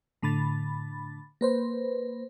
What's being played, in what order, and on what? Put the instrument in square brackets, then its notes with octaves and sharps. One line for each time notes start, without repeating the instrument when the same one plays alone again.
[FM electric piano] A2 D3 B5 A6
A#3 B4 C5